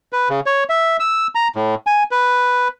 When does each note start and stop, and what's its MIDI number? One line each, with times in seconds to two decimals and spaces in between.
0.13 0.29 71
0.29 0.40 49
0.46 0.64 73
0.70 0.97 76
1.00 1.27 88
1.35 1.48 82
1.56 1.75 45
1.87 2.03 80
2.11 2.68 71